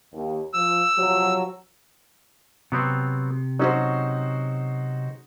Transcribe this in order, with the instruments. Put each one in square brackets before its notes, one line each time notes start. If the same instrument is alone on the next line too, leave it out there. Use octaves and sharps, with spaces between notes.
[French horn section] D#2
[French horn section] F3 [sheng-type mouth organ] E6
[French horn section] C3 F3 F#3
[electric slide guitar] C3 [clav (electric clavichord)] F#3 B3 C4
[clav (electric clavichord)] F#3 C#4 [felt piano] D#4 F#4 C5